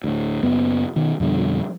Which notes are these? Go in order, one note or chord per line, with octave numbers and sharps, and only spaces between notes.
D2 A2
F#1 F#2 B3
B2 D#3
F2 B2 D3 G3